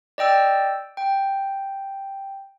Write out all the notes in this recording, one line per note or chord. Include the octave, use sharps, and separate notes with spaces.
D5 D#5 G5 E6
G5